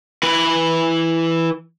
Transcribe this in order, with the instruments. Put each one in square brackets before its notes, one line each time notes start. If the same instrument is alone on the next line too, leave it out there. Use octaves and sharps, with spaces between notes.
[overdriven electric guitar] E3 B4